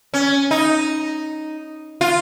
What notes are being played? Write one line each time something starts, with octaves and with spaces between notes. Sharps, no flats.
C#4
D#4
F4